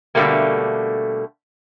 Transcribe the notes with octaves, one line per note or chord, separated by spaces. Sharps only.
B2 D3 F3 G3 A3 A#3